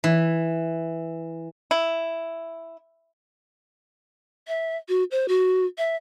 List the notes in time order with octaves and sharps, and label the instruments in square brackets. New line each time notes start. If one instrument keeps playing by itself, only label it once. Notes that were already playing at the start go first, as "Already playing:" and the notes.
[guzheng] E3
[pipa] E4
[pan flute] E5
F#4
C5
F#4
E5